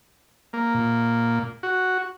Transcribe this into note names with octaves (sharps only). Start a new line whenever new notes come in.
A#3
A#2
F#4